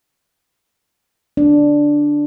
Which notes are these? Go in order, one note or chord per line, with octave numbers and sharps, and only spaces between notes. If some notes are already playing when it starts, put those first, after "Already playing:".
D4